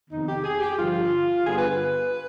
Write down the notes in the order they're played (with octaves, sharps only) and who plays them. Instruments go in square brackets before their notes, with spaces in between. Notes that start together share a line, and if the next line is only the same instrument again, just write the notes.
[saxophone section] F2 C3 D#3 B3 D#4
G4
G#4
G4
G2 D3 F3 F4
G2 D3 G3 B3 G#4
B4
B4